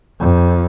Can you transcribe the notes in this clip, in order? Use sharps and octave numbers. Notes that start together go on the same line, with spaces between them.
F2